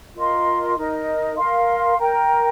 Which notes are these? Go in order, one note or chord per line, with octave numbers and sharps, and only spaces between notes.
F4 A#4 D#5 C6
D#4 A#4 D#5
A#4 F5 C6
A#4 G5 A#5